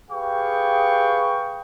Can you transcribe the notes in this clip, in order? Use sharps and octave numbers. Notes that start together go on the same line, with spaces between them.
G4 G#4 B4 F5 G5 C#6